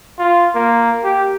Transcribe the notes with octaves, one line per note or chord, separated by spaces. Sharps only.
F4
A#3
G4